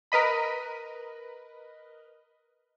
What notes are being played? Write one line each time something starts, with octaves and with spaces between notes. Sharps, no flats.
A#4 B4 D#5 B5